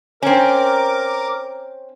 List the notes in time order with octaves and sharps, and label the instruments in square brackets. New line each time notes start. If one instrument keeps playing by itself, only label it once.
[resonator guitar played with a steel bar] C4 C#4 [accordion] A#4 D6